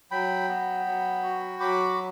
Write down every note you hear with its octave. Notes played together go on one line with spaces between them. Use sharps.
F#3 G5 B5
B3
F#3
F#4
F#3 B5 D6